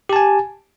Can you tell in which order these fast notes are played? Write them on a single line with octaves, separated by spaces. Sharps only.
G4 A5 G#5